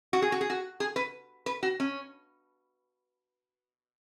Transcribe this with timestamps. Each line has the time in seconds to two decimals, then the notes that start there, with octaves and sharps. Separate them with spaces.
0.13 F#4
0.22 G#4
0.32 F#4
0.41 G#4
0.50 F#4
0.80 G#4
0.96 B4
1.46 B4
1.63 F#4
1.80 C#4